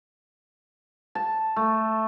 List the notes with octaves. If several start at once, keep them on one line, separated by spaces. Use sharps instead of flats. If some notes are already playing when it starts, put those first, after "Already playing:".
A5
A3